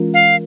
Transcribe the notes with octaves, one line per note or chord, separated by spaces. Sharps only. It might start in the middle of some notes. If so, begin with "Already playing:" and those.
Already playing: E3 G#3 C#4 F4 A#4
F5